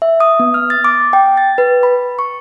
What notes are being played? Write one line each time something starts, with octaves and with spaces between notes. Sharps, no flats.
E5
D#6
B3
F6
A6
D6
G5
A6
B4
B5
C#6